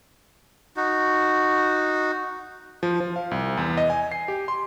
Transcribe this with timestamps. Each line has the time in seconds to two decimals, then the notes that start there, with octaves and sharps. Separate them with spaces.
0.77 D#4 F#4
2.83 F3
3.00 F3
3.16 F5
3.31 C2
3.57 E2
3.77 D#5
3.90 G#5
4.12 C7
4.28 G4
4.48 C6